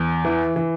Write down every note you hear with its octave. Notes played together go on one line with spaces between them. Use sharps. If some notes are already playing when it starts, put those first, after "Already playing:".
Already playing: E2
E3
E3